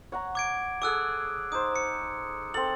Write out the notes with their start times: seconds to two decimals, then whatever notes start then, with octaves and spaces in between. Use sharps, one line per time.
0.12 C#5 F#5 A#5
0.35 D6 G#6 D7
0.82 G#4 A4 G#5 D6 E6 F#6
1.52 D#4 C5 D#6
1.76 C#7
2.54 C4 A4 F#7